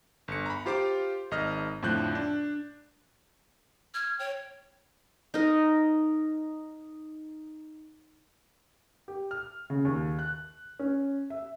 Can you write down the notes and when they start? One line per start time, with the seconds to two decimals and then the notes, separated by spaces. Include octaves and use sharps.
0.28 G1 C#7
0.46 A#5 B5
0.66 F4 G4 C5 F5 D6
1.31 G#1 D#5 F6
1.82 F2 A2 D3 F3 F#6 G6
2.15 D4
3.94 F6 G#6
4.19 C#5 G5
5.34 D#4 A#4
9.08 G4
9.31 F6
9.70 C#3
9.85 D#2
10.19 F#6
10.79 C#4
11.30 E5